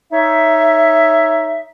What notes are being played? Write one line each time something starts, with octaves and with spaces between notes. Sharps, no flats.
D#4 C#5 E5